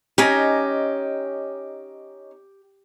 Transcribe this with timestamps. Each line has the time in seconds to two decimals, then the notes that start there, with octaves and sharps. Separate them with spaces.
0.18 C#4 D#4 G4 G#5